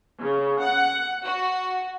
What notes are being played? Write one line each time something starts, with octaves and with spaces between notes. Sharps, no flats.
C#3
F#5
F#4